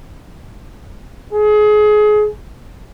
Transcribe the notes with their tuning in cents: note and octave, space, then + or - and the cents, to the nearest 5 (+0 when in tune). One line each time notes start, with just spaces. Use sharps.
G#4 +25